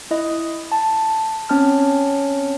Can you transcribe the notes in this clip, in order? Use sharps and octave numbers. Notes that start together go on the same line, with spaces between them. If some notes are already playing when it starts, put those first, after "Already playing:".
E4 D#5
A5
C4 C#4 C#5 A5 F6